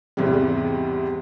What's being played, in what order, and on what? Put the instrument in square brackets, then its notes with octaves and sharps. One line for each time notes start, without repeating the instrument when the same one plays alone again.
[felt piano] E2 G#2 C3 E3 G3